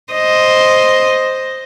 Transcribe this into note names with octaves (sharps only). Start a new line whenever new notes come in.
C5 D#5